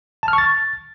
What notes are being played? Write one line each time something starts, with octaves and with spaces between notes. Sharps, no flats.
A5
F6
C#6
A6